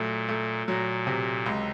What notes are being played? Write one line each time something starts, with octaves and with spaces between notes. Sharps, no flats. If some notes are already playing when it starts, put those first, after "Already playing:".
Already playing: A#2 F#3 A3
A3
A#2 F#3
C3
C#2